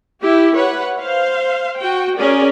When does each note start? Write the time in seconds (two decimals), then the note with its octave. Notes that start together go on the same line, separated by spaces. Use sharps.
0.21 E4 G4
0.56 B4 C#5 F#5
0.99 C5 F5
1.78 F#4 G5
2.17 C#4 G#4 A#4 D5